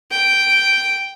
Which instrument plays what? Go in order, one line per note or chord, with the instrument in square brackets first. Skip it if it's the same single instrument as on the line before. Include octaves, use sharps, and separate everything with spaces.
[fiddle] G5